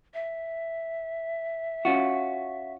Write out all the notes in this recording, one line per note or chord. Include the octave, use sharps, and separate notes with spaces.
E5
C#4 F4 F#4